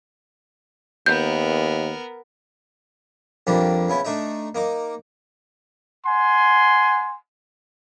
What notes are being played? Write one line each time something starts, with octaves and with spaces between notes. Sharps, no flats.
D#2 B3 A#4 G6
F2 F3 G3 A#3 D4
C#3 B3 E4
A3 D4 D#4 E5
A#3 D#4 D6
F#5 G#5 C6